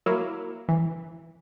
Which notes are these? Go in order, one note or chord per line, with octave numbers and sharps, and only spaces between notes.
F#3 A#3 E4
E3